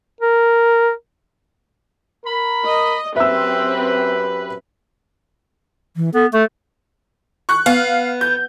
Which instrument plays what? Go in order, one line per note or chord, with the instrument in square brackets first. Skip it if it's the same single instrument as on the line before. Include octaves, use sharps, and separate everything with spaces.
[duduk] A#4
[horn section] A#4 B5
[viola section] D#5
[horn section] F#2 G4 B4 [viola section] C4 [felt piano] E5 E6
[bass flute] E3
[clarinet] B3 [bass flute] A4
[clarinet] A3 [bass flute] A4
[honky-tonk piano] C#6 F#6
[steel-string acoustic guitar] B3 [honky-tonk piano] F5
[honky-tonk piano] G6